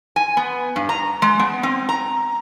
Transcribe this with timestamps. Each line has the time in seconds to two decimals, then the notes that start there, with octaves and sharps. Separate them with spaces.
0.16 G#5
0.37 B3
0.76 G2
0.89 A#5
1.22 G#3
1.40 B3
1.63 C4
1.89 A#5